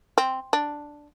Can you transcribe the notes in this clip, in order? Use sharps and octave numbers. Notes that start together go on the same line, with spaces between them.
C4
D4